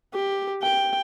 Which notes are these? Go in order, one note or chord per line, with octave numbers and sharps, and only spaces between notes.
G4
G5